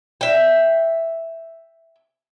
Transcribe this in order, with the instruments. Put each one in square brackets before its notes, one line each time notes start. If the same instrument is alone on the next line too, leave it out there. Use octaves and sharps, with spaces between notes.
[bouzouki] E5 G5